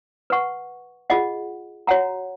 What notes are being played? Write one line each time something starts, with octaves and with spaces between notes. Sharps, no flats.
B4 F#5 C#6
F4 G#4 D#5 F#5
F#4 C#5 F#5 A#5